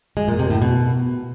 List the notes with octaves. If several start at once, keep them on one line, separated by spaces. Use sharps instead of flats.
G#3
A#2
C3
A2
B2